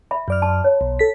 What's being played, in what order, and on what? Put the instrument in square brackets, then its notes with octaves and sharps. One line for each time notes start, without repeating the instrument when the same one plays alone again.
[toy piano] E5 B5
[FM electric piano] F#2 D5 F6
[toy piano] A5 C6
C#5
[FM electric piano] B1
A4 B6